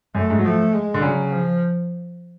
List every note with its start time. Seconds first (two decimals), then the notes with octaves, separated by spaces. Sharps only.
0.15 F#2 A3
0.30 G#2
0.38 F#3
0.44 F3 A3
0.73 G#3
0.94 D3
1.02 C#3 F#3
1.31 F3